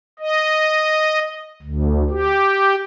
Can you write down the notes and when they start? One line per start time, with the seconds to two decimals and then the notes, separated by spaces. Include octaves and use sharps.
0.19 D#5
1.62 D2
2.10 G4